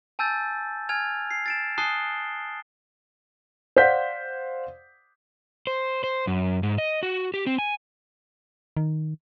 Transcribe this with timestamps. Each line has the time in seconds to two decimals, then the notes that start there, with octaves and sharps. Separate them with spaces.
0.19 G#5 A5 E6 G6 A6
0.89 G#5 F6 G#6 F7
1.31 C7
1.46 A6 D7 E7
1.78 G#5 A5 D#6 F#6 C7 G7
3.76 C5 D5 F5 F#5 G6 B6
5.67 C5
6.04 C5
6.27 F#2
6.63 G#2
6.78 D#5
7.03 F#4
7.34 G4
7.46 C4
7.59 G#5
8.77 D#3